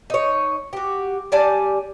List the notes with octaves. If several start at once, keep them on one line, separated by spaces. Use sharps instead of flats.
D#4 C#5
F#4 G4
G3 D5 G#5 A5